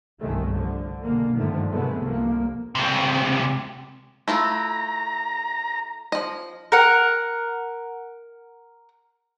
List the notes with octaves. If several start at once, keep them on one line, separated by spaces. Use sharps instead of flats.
G1 C2 D#3 G#3 A3
D3 F3
B2 D3 G#3 A#3
G2 D3 D#3 F3 A3
F#2 C3 G#3 A3 B3
C2 G2 F3 A#3
C#2 C3
A3 E4 F4 A#5
F3 D#5
A#4 F#5